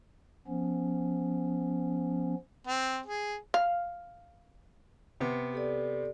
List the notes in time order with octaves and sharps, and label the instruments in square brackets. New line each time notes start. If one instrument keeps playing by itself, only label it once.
[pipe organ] F3 B3 C#4
[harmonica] C4
G#4
[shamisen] F5
[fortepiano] C3 B3
[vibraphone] G4 A4 D5